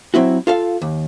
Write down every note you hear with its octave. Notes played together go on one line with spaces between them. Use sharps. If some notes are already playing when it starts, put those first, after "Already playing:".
F#3 C4 E4 F#4
F4 A4 F5
D#2